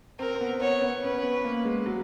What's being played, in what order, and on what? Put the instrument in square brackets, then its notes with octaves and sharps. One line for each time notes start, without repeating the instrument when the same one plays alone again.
[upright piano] C4 [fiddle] A#4
[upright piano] C4
B3
[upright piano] B3 [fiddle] C#5
[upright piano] B3
[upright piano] C#4 [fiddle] B4
[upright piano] B3
A#3
G#3
F#3